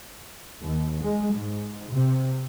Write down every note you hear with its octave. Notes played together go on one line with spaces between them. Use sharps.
D#2
G#3
G#2
C3